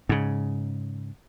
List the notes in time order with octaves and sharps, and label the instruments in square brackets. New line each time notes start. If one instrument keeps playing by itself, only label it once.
[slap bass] G#2 C#3